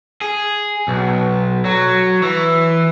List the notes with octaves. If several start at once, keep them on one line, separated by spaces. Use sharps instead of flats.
G#4
B1
F#3
E3